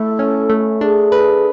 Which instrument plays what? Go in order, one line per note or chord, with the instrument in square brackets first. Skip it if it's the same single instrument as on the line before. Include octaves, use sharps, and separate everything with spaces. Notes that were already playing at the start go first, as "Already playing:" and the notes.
Already playing: [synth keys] A3 E4 [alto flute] A4
[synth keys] C#4
A3
[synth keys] D4 [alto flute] G#4
[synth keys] B4